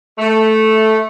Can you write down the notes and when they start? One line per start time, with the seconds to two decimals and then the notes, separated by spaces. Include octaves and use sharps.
0.19 A3